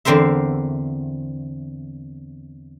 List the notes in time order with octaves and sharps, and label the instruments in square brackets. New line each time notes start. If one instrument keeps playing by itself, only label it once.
[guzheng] E2 D3 C4 A#4 C5 E5